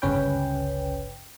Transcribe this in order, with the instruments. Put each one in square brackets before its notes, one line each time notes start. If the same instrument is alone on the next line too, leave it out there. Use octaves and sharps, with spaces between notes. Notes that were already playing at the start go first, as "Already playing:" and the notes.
[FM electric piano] G1 C#2 C#3 C#4 B4 G5